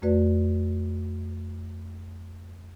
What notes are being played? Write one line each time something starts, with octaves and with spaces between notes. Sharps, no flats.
F2 A3 F#4 B4 D5